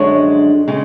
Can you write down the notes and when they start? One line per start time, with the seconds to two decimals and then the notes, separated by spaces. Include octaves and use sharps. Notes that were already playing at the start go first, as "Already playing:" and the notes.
Already playing: F#2 D3 F3 G#3 D4 C#5
0.68 C#3 G#3